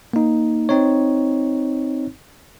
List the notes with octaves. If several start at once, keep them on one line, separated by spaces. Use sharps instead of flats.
A#3 D#4
C4 D#4 C#5